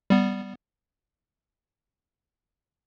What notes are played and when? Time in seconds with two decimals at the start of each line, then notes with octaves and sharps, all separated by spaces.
0.10 G3 B3